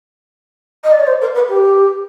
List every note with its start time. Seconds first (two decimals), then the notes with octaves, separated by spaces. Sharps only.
0.84 D#5
0.92 D5
1.00 C#5
1.07 C5
1.21 A#4
1.34 B4
1.49 G4